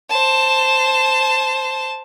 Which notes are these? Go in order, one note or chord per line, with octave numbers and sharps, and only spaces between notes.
C5 A5